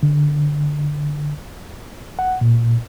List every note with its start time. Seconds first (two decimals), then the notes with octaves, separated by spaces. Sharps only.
0.03 D3
2.19 F#5
2.41 A#2